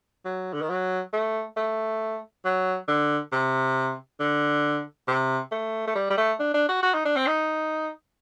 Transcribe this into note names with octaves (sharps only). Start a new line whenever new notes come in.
F#3
D3
D#3
F#3
A3
A3
F#3
D3
C3
D3
C3
A3
A3
G3
G3
A3
D4
D4
F#4
F#4
D#4
D4
C4
D#4